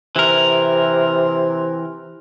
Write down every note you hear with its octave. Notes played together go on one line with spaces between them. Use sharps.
C3 E3 A#4